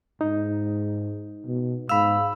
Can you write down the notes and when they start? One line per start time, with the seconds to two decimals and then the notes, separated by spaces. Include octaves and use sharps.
0.21 G#2 D#4
1.46 B2
1.89 G#2 F5 B5 E6